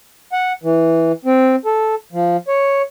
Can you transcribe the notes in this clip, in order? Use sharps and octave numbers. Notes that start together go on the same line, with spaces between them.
F#5
E3
C4
A4
F3
C#5